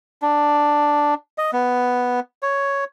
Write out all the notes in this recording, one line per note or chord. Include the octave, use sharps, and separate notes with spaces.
D4
D#5
B3
C#5